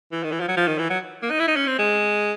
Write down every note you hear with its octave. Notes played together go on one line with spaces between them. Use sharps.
E3
D#3
E3
F3
F#3
F3
D#3
E3
F#3
A#3
D#4
E4
D#4
C#4
C4
G#3